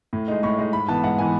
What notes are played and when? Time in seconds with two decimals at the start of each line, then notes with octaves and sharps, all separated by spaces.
0.13 A2
0.28 G#3 D#4
0.43 A2 C#6
0.59 G#3 D#4
0.73 G#2 B5
0.88 E3 B3 A5
1.04 G#2 F#5
1.18 E3 B3 G#5